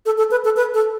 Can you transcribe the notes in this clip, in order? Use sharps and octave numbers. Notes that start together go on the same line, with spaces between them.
A4
A4
B4
A4
B4
A4